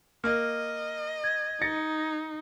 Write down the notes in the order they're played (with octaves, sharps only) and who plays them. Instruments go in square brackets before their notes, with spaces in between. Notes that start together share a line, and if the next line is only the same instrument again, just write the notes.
[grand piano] A#3 [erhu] D#5 [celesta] F6
[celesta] G#6
[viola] D#4 [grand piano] A6 A#6 C#7